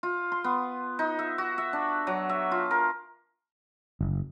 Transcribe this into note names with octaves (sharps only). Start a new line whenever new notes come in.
F4
C6
B3
D#4
E5
F#4
E5
D4
F#3
E5
F4
A#4
F#1